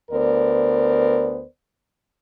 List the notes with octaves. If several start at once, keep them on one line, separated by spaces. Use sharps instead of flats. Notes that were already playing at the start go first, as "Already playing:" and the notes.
D2 B3 A#4 C5 D5